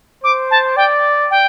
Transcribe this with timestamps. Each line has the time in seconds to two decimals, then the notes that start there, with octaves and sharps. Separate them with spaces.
0.24 C5 D6
0.51 A5
0.76 D5 G5
1.31 G5